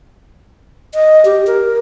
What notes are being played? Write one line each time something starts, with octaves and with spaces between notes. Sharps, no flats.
D#5
G4
A#4